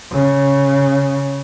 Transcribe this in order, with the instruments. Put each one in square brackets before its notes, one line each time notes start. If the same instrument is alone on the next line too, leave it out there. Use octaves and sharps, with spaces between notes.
[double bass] C#3